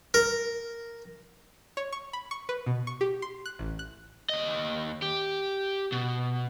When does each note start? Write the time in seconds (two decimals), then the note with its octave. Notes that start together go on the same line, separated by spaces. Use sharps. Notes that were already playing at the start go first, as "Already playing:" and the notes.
0.14 A#4
1.77 C#5
1.92 C#6
2.13 B5
2.31 C#6
2.49 B4
2.66 B2
2.87 C#6
3.01 G4
3.22 C6
3.46 F#6
3.59 A1
3.79 F#6
4.29 D#2 D#5
5.02 G4
5.92 B2